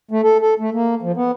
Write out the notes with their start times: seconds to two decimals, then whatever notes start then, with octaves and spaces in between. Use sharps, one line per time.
0.11 A3
0.23 A4
0.41 A4
0.60 A3
0.74 A#3
1.02 F3
1.16 B3